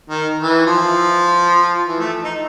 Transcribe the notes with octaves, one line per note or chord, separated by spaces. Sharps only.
D#3
E3
F3
E3
A3
D#4